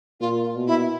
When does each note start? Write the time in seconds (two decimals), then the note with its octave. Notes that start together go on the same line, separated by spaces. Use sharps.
0.20 A#2 F4
0.56 B2
0.67 E4